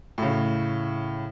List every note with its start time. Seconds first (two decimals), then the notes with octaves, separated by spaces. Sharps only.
0.18 A2 C#3